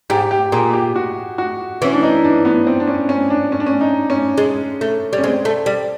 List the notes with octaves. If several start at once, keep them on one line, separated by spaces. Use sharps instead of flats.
G#2 G4
G4
A#2 G#4
G4
F#4
F#4
E3 C#4
D4
D#4
D4
B3
C4
D4
C#4
C#4
D4
C#4
D4
C#4
D#4
C#4
G#3
A3
G3
C#4
G#3 C4
A3
G3